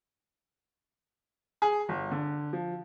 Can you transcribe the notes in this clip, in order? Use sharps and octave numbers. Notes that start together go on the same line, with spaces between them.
G#4
G1
D3
F3